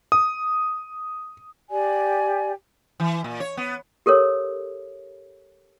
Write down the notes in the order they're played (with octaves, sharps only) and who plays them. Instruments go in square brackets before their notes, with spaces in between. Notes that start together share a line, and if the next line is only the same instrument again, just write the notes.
[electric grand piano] D#6
[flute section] G4 D5 G#5
[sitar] E3
A#2
C#5
B3
[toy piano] G4 A4 A#4 C#5